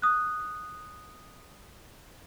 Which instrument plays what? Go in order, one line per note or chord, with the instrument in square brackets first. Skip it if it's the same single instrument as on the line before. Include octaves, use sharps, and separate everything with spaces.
[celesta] D#6 F#6